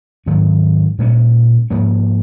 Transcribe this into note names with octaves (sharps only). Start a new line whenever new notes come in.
G#2 D#3 F#3 C#4
A#2 G#3 C#4
G#2 F3 A#3 C#4